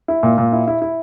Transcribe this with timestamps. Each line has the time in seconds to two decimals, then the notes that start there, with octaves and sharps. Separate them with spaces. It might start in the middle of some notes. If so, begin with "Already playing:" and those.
0.08 E4
0.23 A#2
0.38 A#2
0.52 E4
0.68 E4
0.82 E4